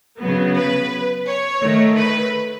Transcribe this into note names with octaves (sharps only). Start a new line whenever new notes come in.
C#3 F#3 B3
B4
C#5
D#3 A3
B4